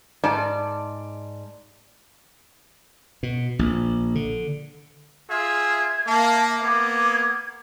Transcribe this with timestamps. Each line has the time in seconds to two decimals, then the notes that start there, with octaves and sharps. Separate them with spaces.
0.24 G#2 D5 A5
3.23 B2
3.59 A#1
4.15 D3
5.30 F4 G#4 E5 G#6
6.07 A#3 E5 A5
6.62 A#3 B3 D6 G#6